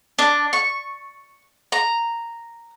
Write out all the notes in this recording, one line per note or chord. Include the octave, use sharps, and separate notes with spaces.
D4
C#6
A#5